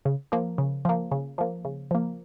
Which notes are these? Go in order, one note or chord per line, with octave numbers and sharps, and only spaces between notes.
C#3
F3 A#3
C#3
F3 A#3
C#3
F3 A#3
C#3
F3 A#3